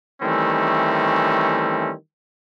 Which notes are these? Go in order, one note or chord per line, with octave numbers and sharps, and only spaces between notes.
D#3 E3 G3 A3 C4 C#4